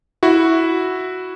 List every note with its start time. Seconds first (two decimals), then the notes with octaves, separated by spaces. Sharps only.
0.23 E4 F#4